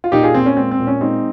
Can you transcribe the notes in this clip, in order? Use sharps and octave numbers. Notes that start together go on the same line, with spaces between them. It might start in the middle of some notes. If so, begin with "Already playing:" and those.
F4
A#2 D#4 G4
F4 G#4
A#2 C4
C#4
G#3 C4
C4
A#2
C#4
G#3 C4 D#4